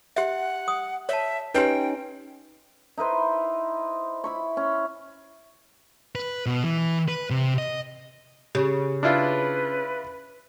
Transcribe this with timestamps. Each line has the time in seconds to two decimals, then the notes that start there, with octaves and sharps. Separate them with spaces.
0.16 G4 E5 F#5
0.68 D#6
1.09 C#5 E5 A5
1.54 C#4 D#4 G4 B4 G5
2.98 D#4 E4 B4 C5
4.24 E4 B5 C#6
4.57 C#4
6.15 B4
6.46 B2
6.64 E3
7.08 B4
7.30 C3
7.58 D#5
8.55 C#3 G4
9.03 D4 E4 F4 B4